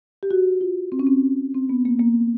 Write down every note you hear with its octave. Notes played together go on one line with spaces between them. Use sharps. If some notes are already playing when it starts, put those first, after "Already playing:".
G4
F#4
F4
C4
C#4
C4
C4
B3
A#3
A#3